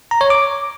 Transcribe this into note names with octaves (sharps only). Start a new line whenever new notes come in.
A#5
C#5
D6